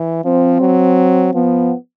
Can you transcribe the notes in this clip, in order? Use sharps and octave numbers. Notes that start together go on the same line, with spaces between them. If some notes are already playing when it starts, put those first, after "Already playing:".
Already playing: E3
F3 C4
F#3
F3 B3